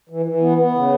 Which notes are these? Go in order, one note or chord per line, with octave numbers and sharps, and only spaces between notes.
E3
E3
B3
B3
C#3